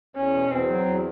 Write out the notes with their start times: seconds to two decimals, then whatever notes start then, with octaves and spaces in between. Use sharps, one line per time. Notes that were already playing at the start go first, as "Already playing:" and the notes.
0.16 E2 C#4
0.34 B2
0.51 E2 C4
0.68 F#3
0.86 E2